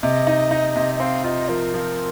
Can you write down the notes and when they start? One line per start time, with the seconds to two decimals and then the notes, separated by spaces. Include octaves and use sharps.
0.02 C3 D#5
0.27 D#4
0.51 D#4
0.76 C3
0.95 D#5
1.00 C4 F5
1.24 F4 D#5
1.49 F3 A#4
1.74 F3